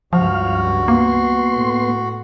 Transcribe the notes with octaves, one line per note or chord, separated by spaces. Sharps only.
C#2 G2 F3 F#4 F5
A#3 B3 C6
A2